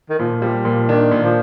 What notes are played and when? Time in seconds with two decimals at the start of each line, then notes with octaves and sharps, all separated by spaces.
0.10 D#3
0.19 A#2 F3
0.42 F3 G3
0.65 A#2 F3
0.88 D#3 D4
1.11 A#2
1.23 F3